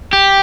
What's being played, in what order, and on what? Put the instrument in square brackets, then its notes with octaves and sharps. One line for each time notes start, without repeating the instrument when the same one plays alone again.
[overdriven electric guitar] G4